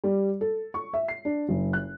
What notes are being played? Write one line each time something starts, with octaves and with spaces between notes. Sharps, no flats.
G3
A4
C#6
E5
C7
D4
F#1
F#6